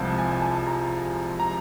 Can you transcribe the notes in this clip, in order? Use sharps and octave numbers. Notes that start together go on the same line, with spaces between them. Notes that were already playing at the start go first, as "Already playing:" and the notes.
Already playing: C2 C3 F3 G#3 A5
G#5
G#5
A5
A#5
A#5